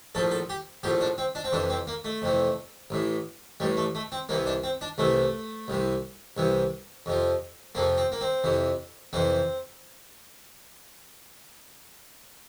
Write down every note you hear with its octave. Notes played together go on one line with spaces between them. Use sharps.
A#1 A2 F3 A4
A4
G4
A#1 A2 F3 G4
D4
C4
D4
C4
F2 C3 E3 D4
C4
A#3
A3
F2 C3 E3
A1 A2 E3
A1 A2 E3 G3
A3
A3
C4
C2 C3 E3 A#3
D4
C4
D4
C2 C3 E3 A3
C2 C3 E3
C2 C3 E3
F2 C3 F3
F2 C3 F3 A#3
C4
A#3
C4
F2 C3 E3
F2 C3 E3 C4